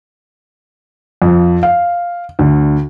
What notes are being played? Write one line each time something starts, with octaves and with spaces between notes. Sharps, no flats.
F2
F5
D2